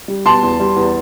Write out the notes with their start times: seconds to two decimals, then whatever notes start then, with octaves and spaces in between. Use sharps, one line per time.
0.08 G3
0.26 B2 A5 C6
0.42 E2
0.60 G3
0.76 E2